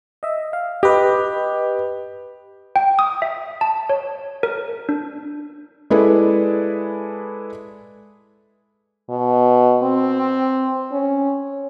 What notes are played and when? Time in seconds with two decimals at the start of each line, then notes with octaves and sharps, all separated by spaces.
0.23 D#5 E5
0.53 F5
0.83 G4 B4 D#5
2.76 G5
2.99 D#6
3.22 E5
3.61 A5
3.89 C#5
4.43 A#4
4.89 D4
5.90 G#3 E4 G#4 A4 B4 D5
9.10 B2
9.83 C4
10.92 C#4